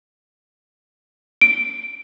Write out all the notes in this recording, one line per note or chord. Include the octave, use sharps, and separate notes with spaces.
D7